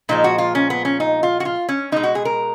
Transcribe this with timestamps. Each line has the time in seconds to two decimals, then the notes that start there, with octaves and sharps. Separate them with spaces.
0.09 A#2 F3 G#3 D#4
0.24 F#4
0.38 F4
0.55 C#4
0.70 B3
0.85 C#4
1.00 D#4
1.23 F4
1.40 F#4
1.45 F4
1.69 C#4
1.92 B2 G#3 D#4
2.03 F#4
2.15 G#4
2.25 A#4